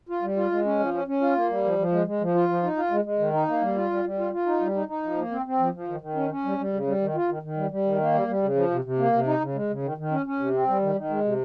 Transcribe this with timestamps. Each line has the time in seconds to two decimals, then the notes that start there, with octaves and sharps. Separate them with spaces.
0.09 F4
0.22 G3
0.36 F4
0.52 G#3
0.65 C#4
0.79 F3
0.94 C#4
1.08 C#4
1.21 F4
1.35 A#3
1.50 G3
1.64 F3
1.78 F3
1.92 G#3
2.07 G#3
2.21 F3
2.35 F4
2.49 F3
2.63 D#4
2.77 F4
2.91 G#3
3.05 G#3
3.19 D#3
3.33 D#4
3.48 A#3
3.62 G3
3.76 F4
3.90 G3
4.04 G3
4.18 F4
4.33 F4
4.46 D#4
4.60 G3
4.75 D#4
4.88 D#4
5.03 F3
5.17 A#3
5.31 C4
5.46 C4
5.59 F3
5.74 F3
5.88 D#3
6.01 D#3
6.15 C#4
6.30 C#4
6.45 G3
6.58 G3
6.73 C#3
6.87 G3
7.01 D#3
7.15 F4
7.29 D#3
7.43 D#3
7.57 G3
7.71 G3
7.85 D#3
8.00 A#3
8.14 G3
8.28 G3
8.42 C#3
8.55 F3
8.70 C3
8.84 C3
8.99 A#3
9.13 C3
9.26 D#4
9.40 C#3
9.55 G#3
9.70 C#3
9.83 D#3
9.97 D#3
10.11 C#4
10.26 C#4
10.39 C3
10.53 C4
10.68 G3
10.82 D#3
10.95 D#3
11.10 G#3
11.25 C3